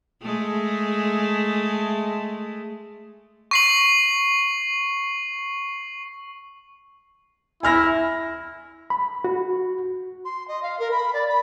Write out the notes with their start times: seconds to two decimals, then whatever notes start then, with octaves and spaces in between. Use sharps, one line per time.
0.22 G#3 A3
3.51 C#6 C7 F#7
7.63 E4 G#5 F6 A#6
8.90 B5
9.24 F#4
10.24 C6
10.47 D#5
10.62 F5
10.79 A#4
10.91 B5
11.13 D5
11.28 B5